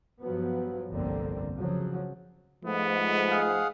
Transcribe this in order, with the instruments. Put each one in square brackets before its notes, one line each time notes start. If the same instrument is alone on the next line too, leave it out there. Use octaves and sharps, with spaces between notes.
[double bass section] G2 F3 F#3 B3
G1 C2 F2 D3 A#3 C4
C#3 F3 F#3
[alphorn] G#2 [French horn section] F3 G#3 A3 [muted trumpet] B3
[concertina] G#4 F5 F#5